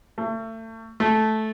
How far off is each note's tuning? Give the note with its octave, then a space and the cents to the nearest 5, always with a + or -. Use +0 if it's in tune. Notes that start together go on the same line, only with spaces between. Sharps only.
A3 +35
A3 -10